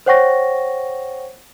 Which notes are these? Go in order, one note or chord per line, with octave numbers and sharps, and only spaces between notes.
C5 C#5 F#5 G5 C#6 A#6